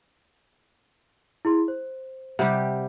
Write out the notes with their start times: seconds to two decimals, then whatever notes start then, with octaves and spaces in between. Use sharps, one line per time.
1.45 E4 G#4 C6
1.68 C5
2.39 C3 G3 G4 F#5